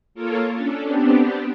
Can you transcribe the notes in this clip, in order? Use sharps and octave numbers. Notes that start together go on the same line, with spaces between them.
A#3 F4 A4 A#4 C#5
C#4 D4 A4
B3 C4 D4 G4